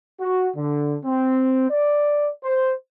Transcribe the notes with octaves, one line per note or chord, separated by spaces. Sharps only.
F#4
D3
C4
D5
C5